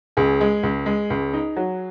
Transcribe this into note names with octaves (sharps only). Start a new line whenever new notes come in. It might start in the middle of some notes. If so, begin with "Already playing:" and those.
C#2 G#4
G#3
C#2
G#3
C#2
D#4
F#3